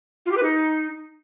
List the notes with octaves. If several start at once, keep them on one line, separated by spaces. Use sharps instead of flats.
F4
G4
B4
D#4